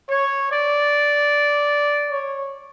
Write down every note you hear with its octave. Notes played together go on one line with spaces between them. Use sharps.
C#5
D5
C#5